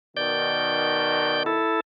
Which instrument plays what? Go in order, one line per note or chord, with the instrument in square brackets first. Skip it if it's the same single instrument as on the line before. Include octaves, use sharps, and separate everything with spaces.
[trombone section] B2 D#3 [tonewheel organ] D5 G6
[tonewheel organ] E4 A4